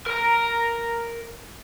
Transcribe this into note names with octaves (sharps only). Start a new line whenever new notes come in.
A#4 A#5